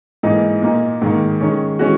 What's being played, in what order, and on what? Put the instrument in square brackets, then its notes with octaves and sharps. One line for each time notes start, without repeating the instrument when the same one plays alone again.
[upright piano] G#2 E3 A#3 D#4
A#2 A#3 D#4
G#2 D#3 A#3
D#3 G#3 C#4
E3 G#3 C#4 F#4